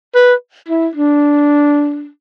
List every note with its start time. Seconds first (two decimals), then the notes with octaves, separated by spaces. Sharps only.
0.15 B4
0.68 E4
0.95 D4